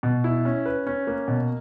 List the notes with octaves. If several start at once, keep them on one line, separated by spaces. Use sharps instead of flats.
B2
E4
C#4
B4
C#4
A#3
B2